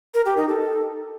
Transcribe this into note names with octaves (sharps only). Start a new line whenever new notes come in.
A#4
G4
D#4
A4